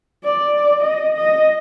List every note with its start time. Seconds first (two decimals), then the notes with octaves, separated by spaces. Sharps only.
0.24 D5
0.82 D#5
1.16 D#5